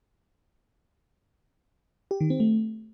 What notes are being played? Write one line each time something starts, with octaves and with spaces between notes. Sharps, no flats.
G4
D#3
C4
A3